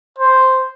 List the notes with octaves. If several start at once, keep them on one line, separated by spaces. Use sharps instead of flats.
C5